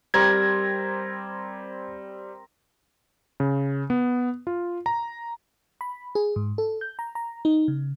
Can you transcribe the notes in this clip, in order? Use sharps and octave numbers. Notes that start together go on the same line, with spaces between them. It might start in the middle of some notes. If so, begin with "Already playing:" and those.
G3 C4 G4 A#4 A#5 G#6
C#3
B3
F4
A#5
B5
G#4
G#2
A4
G6
A#5
A#5
D#4
C#3